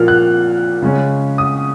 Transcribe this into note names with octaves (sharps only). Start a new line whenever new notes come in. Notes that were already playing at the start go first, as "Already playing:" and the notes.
Already playing: A#2 F3 A#3 F6
F#6
C#3 G#3 C#4
D#6